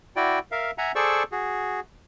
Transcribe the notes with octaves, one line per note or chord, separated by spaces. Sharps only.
E4 F#4 D5 G5
A#4 E5 F5
E5 F#5 G#5 A#5
G#4 A4 C5 D5 C#6 E6
F#4 G#4